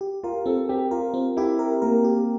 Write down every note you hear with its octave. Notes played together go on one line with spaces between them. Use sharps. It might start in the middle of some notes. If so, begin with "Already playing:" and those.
G4
F4 A#4
C4 A4
C4 G4
F4 A#4
C4
E4 G4
A#4
A#3 A#4
G4